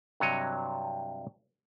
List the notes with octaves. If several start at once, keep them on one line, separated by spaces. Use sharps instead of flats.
G2 C3 F#3 C#5 D#5